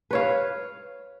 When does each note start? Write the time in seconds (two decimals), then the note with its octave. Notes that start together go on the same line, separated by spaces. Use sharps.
0.11 B4 C#5 F5